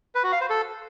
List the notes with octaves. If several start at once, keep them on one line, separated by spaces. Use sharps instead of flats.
B4
F#4
F5
C5
A4